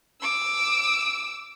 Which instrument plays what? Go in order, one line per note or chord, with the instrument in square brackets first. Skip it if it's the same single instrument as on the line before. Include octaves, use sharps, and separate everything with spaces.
[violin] D6 E6